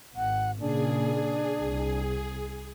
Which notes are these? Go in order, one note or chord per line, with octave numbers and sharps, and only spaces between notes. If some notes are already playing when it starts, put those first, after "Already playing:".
G#1 F#5
A#2 C#3 D4 G#4
C2